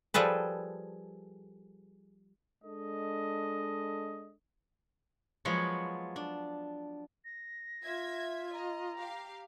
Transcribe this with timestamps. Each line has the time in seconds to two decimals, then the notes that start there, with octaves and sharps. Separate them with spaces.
0.14 F3 G3 G#4 A4 B4
2.63 G#3 D4 A4 D#5
5.45 F3 F#3 G#3 B3 C#5
6.16 D4
7.25 A#6
7.83 F4 E5 G#6 B6
8.53 D#5 A#5
8.97 G4 F5